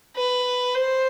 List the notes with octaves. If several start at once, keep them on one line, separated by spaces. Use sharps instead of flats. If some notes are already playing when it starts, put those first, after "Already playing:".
B4
C5